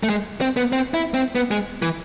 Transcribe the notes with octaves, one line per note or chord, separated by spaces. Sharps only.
A3
G#3
C4
B3
C4
E4
C4
B3
G#3
E3